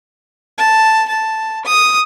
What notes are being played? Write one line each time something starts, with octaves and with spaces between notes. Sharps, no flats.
A5
A5
D#6